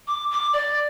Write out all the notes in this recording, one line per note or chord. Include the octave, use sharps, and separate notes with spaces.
D6
D6
D5